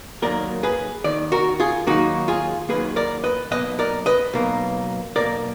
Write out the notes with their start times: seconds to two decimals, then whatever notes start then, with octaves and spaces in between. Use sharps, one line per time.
0.22 D#2 D#3 F#3 A#3 A#4 D5
0.63 G#4 B4
1.04 D#2 D#3 D5
1.32 F#4 A#4
1.60 F4 G#4
1.87 D#2 D#3 F#3 A#3 D#4 F#4
2.28 F4 G#4
2.69 D#2 D#3 F#3 A#3 G#4 B4
2.96 A#4 D5
3.24 B4 D#5
3.51 B1 B2 A#3 B4 D#5
3.79 A#4 D5
4.06 B4 D#5
4.33 B1 B2 A#3
5.16 B1 B2 A#3 A#4 D5